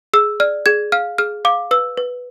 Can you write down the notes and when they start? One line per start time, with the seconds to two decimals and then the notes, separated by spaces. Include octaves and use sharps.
0.13 G#4 E6
0.40 D5 F6
0.66 G#4 G#6
0.92 F5 F6
1.18 G#4 F6
1.45 F5 D6
1.71 B4 E6
1.97 B4